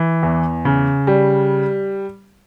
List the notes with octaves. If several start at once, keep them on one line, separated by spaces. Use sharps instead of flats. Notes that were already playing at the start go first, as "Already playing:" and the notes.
Already playing: E3
E2
C#3
G3